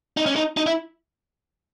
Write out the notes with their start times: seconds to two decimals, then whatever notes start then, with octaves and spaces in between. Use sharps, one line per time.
0.17 D#4
0.26 C#4
0.36 D#4
0.57 D#4
0.66 E4